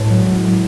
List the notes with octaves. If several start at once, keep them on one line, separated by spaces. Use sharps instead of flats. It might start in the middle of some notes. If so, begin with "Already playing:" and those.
Already playing: C#2 A2 C#3 A5
F#3 A3
A2